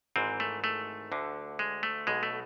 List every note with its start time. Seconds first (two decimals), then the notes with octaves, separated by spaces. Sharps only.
0.16 G#1 G#2 E3 C4
0.40 A3
0.64 A3
1.12 D2 D3
1.59 G#3
1.83 A3
2.07 B1 B2 G#3
2.23 A3